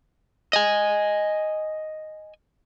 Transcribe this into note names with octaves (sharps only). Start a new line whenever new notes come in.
D#5 G#5